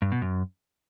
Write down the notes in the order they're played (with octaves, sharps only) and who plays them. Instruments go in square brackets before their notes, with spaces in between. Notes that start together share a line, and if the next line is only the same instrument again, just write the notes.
[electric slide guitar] G2
B2
F#2